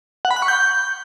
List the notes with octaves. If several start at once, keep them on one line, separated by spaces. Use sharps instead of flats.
F#5
B5
F#6
C#6
G6